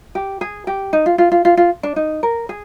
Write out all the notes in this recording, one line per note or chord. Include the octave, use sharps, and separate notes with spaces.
G4
G#4
G4
D#4
F4
F4
F4
F4
F4
D4
D#4
A#4
G#4